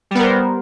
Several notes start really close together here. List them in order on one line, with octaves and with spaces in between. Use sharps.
G3 B3 A#4 C5